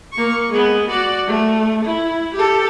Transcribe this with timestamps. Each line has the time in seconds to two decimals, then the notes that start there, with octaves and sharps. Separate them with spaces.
0.13 A#3 C#6
0.49 G#3 B3
0.90 F#4 D5
1.27 A3
1.85 E4
2.35 G4 A4